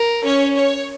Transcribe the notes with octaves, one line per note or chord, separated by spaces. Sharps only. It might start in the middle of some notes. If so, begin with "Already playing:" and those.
Already playing: A#4
C#4 C#5
C#5